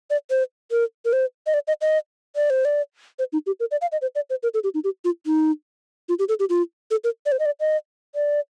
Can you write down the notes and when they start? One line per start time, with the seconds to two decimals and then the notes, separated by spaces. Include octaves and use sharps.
0.10 D5
0.30 C5
0.71 A#4
1.05 A#4
1.13 C5
1.47 D#5
1.54 D5
1.68 D#5
1.81 D#5
2.36 D5
2.50 C5
2.65 D5
3.19 C5
3.33 D#4
3.46 G4
3.60 A#4
3.71 D5
3.81 F5
3.92 D#5
4.02 C5
4.15 D5
4.30 C5
4.43 A#4
4.54 A4
4.64 G4
4.74 D#4
4.84 G4
5.05 F4
5.26 D#4
6.09 F4
6.19 G4
6.29 A4
6.40 G4
6.50 F4
6.91 A4
7.04 A#4
7.26 D5
7.32 C5
7.39 D#5
7.46 D5
7.60 D#5
8.15 D5